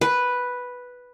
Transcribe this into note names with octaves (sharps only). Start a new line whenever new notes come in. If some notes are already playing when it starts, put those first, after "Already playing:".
B4